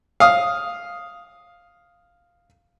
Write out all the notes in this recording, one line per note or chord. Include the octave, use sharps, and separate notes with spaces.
F5 D#6